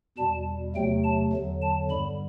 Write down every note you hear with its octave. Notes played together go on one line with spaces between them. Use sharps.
E2 B2 G3 A5
E2 C3 F#3 A3 G5
A5
E2 D3 F#3
A5
G2 D3 G3 B5